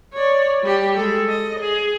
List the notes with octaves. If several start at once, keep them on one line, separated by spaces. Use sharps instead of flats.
C#5 D5
G3 G4
G#3 A4
D#5
G#4